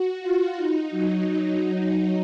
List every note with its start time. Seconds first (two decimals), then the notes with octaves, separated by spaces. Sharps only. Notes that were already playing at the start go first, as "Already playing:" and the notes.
Already playing: F#4
0.21 F4
0.56 D#4
0.91 F#3